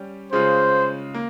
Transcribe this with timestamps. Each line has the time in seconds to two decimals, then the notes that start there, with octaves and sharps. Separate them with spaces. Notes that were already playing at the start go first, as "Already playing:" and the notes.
Already playing: G3 C#4 G4
0.33 C#3 G#3 C#4 F4 C5
1.14 A#3